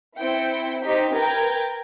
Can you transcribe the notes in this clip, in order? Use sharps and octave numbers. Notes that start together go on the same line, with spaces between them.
C4 E4 G5 C#7
C4 D#4 G4 B6
A#4 B4 G5 A#5 G#6 A6